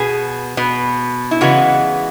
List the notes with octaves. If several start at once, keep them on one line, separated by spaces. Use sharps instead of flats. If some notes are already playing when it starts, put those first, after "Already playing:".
Already playing: B2 B3 G#4
B2 B3
E4
C#3 E3 G#3 B3 F#4